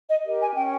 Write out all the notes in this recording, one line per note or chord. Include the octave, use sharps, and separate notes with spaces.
D#5
G4 A#4
G#5
C#4 G5